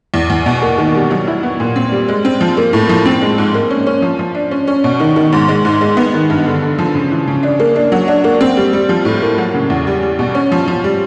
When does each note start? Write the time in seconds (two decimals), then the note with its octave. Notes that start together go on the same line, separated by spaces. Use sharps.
0.14 E2
0.30 E2
0.46 B2
0.62 A#3
0.78 D#3
0.95 G3
1.11 F#3
1.27 E4
1.43 B3
1.60 A#2
1.76 C4
1.92 G3
2.08 G#3
2.25 C4
2.41 F3
2.57 A#3
2.73 A2
2.89 F3
3.06 C4
3.22 G#3
3.38 G#2
3.54 A#3
3.70 C#4
3.87 C#4
4.02 F3
4.19 F3
4.35 D4
4.51 C#4
4.67 C#4
4.84 B2
5.00 D#3
5.16 D#3
5.32 G#2
5.48 G#3
5.65 G#2
5.81 G#3
5.97 B3
6.14 D#3
6.30 G2
6.46 D3
6.62 D3
6.79 F3
6.95 C#3
7.11 E3
7.27 C#3
7.43 D4
7.60 A#3
7.76 D4
7.92 F#3
8.08 D4
8.24 A#3
8.41 C4
8.57 G3
8.73 G3
8.89 F3
9.05 A2
9.22 A#3
9.38 F#3
9.54 C#3
9.70 E2
9.87 G3
10.03 G3
10.19 B2
10.35 C#4
10.52 F3
10.68 F3
10.84 G3